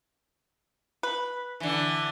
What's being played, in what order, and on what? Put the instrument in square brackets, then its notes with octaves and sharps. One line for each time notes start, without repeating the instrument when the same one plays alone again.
[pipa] B4
[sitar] D3 E3